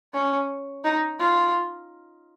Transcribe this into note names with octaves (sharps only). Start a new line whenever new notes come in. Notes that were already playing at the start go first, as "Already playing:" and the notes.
C#4
D#4
F4